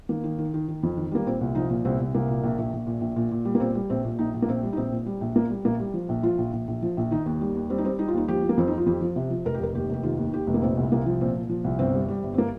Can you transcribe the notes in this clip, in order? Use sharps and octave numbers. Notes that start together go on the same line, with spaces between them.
D#3 A#3
D#3
D#3
D#3
D#3
F2
D#3
G3 A#3
A#2 C4
C2
F3 D#4
A#2
C2 C4
C2
C2 A#3
A#2
A#1
A#1
A#1
A#2
A#1
A#2
A#2
G3
A#3
A#2 C4
G3
A#1 C4
A#2
A#1 D#4
A#1
A#3
A#1 C4
G3
D#4
A#1 C4
A#2
G3
A#1
A#2 A#3
G3
A#1 A#3
G3
F3
A#1
F3 F4
A#1
A#1
A#1
F3
A#1
D#3 D#4
D#2
G3
D#2
G3 C4
D#4
G3 C4
G3 D#4
F4
D#2 D#4
F3 G4
F3
A#3
F2 C4
F3 D#4
F4
F2 G4
F3
C3
F3
F1 A#4
G4
F1 A#4
D#2 G4
F1 G4
D#3 F4
D#2
D#2 G4
F1
A#3
A#2 C4
C2
C2 A#3
F3
A#2 C4
A#2
F3
C2
G1 C4
G3
G3
G1
C4
A#3